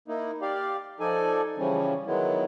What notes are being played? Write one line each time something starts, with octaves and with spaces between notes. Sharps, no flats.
A#3 D#4 E4
G4 D5 F5
F3 D#4 A4 D5 G#5
C#3 E3 F3 G3 C#4
D#3 F#3 G#3 B3 E4